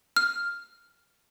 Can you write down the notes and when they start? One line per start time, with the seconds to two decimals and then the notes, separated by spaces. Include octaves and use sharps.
0.16 F6